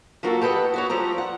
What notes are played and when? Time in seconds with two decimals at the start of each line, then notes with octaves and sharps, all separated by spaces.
0.23 F3 F#3 A#3 F#4 G4 A4
0.41 G4 A4 B4 D#5 F#5
0.74 E4 F#4 C#5
0.89 F3 G3 A4 A#5
1.18 F#5